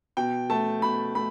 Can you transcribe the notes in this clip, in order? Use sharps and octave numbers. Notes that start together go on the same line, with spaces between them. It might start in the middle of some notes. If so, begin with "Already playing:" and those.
B2 G5
A3 A5
B2 B5
A3 B5